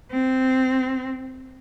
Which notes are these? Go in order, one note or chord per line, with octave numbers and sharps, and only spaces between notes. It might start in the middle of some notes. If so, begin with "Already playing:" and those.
C4